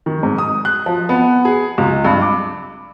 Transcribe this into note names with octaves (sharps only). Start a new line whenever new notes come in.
D#3
G#2
D#6
F#6
F3
B3
G#4
C#2
G2
D6